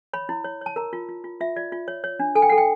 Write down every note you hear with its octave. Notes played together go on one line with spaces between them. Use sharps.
C#5 B5
E4
C#5
C#5 A5
A#4 A#5
F4
F4
F4
F4 E5
F4 D5
F4
C#5
C#5
D4
A4 G#5
G5
F#5
A4
G5